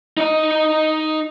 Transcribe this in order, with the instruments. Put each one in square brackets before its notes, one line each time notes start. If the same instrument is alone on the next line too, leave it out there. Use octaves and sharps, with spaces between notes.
[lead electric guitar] D#4 D#5